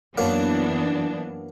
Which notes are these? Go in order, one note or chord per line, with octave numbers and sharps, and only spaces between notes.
F#2 E3 F#3 A#3 B3 D4